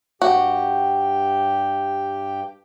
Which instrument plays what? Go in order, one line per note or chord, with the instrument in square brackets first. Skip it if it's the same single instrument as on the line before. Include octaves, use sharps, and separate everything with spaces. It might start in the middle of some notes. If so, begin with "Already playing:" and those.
[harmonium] G2 G4 G5 [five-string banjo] F#4